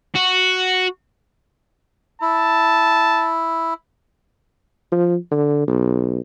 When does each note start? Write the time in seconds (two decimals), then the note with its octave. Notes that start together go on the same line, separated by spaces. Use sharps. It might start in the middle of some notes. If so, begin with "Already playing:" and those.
0.15 F#4
2.22 E4 A5
4.92 F3
5.31 D3
5.67 B1